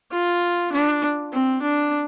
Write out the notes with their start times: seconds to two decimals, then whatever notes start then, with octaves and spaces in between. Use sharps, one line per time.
0.12 F4
0.72 D4
1.33 C4
1.62 D4